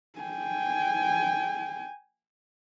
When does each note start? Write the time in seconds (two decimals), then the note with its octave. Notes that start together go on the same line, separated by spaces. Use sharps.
0.19 G5 G#5